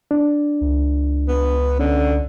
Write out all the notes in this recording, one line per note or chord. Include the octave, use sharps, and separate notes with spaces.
D4
C#2
B3
D3 C#4